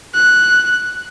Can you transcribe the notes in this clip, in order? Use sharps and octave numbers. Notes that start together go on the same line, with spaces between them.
F#6